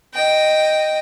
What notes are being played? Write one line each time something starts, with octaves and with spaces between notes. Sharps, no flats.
D#5 G5